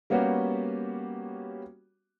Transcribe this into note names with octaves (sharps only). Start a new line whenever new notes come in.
G3 A#3 B3 C#4 F#4 G4